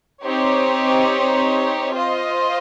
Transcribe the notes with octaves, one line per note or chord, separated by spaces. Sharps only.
C4 D#4 G4 C#5
F4 C5 D#5